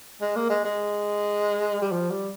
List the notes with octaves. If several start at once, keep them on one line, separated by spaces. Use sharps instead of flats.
G#3
A#3
G#3
G#3
G3
F3
G3